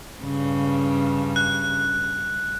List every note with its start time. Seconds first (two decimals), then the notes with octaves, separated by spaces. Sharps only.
0.24 G2 C#3
1.36 F#6